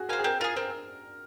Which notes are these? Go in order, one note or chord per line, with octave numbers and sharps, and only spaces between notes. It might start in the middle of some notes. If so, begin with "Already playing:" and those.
Already playing: F#4 G#4
A#4 C5 F5 G#5
G#4
C4 A#4
F4 G#4 A#4
C4 A#4